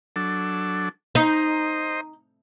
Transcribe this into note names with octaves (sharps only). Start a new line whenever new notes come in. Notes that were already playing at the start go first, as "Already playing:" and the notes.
F#3 D4 A4
D#4 C5 D#5